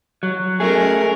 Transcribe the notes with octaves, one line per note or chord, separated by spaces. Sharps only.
F#3
A3 C#4 G#4 A#4